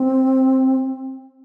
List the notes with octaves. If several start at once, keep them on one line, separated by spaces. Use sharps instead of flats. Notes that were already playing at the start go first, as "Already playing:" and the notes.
Already playing: C4